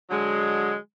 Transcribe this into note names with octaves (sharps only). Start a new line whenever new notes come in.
D3 F#3 G#3